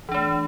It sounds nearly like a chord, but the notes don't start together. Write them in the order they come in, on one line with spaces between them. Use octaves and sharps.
E3 D4 A3